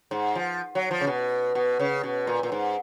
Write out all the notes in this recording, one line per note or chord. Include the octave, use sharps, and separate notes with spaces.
G#2
F3
F#3
F3
C#3
B2
B2
C#3
B2
A#2
A#2
G#2